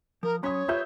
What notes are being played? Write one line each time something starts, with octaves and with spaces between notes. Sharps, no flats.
F3 A#4
F#3 C#4 C#5 B5 C6 D#6
F4 G4 B4 C5 E5 G6